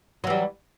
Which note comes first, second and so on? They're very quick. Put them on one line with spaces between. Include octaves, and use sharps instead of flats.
F#3 E3 G3